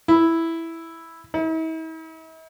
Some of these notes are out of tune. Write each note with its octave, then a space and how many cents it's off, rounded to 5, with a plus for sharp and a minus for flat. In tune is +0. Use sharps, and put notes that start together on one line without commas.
E4 +0
E4 -45